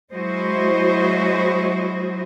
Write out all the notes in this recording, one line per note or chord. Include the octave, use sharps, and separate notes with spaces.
F#3 G#3 E4 F#4 C5 D#5